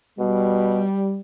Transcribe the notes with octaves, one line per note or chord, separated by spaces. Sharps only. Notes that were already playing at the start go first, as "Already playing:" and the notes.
B2 G3